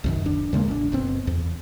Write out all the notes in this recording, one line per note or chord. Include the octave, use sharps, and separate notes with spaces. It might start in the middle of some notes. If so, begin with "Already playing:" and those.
C2 F#2 D#3
D1 D4
D#2 C#3 G#3 A#3
A1 D4
F#1 B2 C4
E2